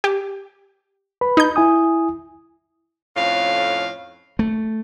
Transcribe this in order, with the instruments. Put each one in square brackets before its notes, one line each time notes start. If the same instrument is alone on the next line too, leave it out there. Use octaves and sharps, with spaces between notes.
[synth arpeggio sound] G4
[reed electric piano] B4 B5
[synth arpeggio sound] D#4 G6
[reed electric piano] E4 G#5 D#6
[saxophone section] F2 A2 C#4 F5
[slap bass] A3